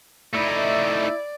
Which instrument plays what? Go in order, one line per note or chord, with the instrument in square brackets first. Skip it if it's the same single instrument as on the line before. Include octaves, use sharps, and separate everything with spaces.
[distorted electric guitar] A3 D#4 [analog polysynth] E4 [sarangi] D5